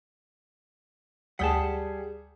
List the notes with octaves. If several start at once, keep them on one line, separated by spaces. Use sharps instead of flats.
D2 G3 G#4 F#5 G5 A5 D#6 B6